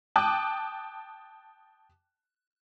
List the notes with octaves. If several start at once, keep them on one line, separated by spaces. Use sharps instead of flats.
G5 A5 D6 D#6 F#6